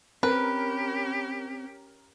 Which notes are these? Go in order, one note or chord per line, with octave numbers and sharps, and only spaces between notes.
C4 C#4 G4 A#4 B4